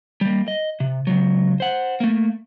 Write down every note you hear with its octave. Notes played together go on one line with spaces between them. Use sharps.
G3 A#3
D#5
C3
C#2 F#3
C5 F#5
A3 A#3